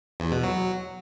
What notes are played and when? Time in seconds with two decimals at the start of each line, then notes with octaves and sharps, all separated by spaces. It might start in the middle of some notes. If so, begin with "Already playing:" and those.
0.20 E2
0.32 B2
0.43 F#3